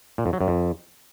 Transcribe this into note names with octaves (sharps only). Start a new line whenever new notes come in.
A#2
F2
F#3
F#2
F2